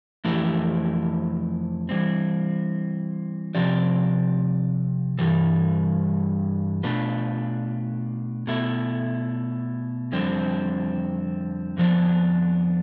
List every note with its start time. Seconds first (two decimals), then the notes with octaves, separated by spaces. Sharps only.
0.25 F2 E3 A3 E4 G4
1.89 E3 G3 C4
3.55 C3 F3 C4 G4 D5
5.19 G2 E3 G3
6.83 B2 A3 D4 F4 B4
8.47 B2 A3 E4
10.12 F2 D3 G3 C4
11.77 F2 D3 F3 B3 D4